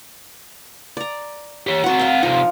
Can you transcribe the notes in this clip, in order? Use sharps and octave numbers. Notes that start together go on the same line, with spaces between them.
D5 A#5
G4 C#5
F#3 C4 F#4 F#5
F5 G5
C3 F3 D#4